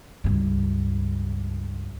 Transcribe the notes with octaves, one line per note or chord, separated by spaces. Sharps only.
C#2 G2